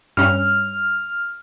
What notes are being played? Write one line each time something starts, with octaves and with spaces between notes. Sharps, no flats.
G2 C#4 F6